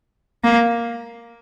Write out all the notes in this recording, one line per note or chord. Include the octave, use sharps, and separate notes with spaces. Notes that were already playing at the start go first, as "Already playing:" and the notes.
A#3